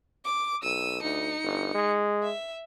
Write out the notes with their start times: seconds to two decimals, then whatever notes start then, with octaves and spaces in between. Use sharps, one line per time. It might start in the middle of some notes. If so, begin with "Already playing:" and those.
0.25 D6
0.63 B1 E6 D#7
1.03 D2 D#4 C#7
1.43 G1
1.75 G#3
2.23 E5